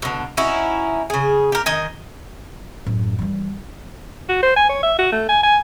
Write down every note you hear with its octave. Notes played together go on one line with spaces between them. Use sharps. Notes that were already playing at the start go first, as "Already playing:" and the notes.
B2 D3
C#4 D#4 E4 F#4
C#3 G#4
G4 A#4
D#3 D#5 G#5
F#2 A2
E3 G3
F#4
C5
G#5
C#5
E5
F#4
A3
G#5
G#5